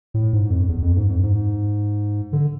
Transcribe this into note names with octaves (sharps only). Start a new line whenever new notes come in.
A2
G#2
F2
E2
F2
G#2
F2
G#2
D3